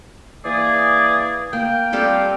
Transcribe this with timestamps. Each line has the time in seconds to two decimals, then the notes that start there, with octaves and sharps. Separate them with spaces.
0.45 E3 A#3 G#4 D5
1.53 A#3 G5
1.93 G3 C4 F4 G4 A4 F5